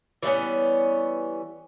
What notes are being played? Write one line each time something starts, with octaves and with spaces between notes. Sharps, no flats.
E3 G3 B3 C#4